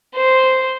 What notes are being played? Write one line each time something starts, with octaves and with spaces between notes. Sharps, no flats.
C5